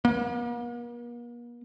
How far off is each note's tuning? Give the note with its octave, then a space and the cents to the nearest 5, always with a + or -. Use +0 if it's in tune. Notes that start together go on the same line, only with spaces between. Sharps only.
A#3 +45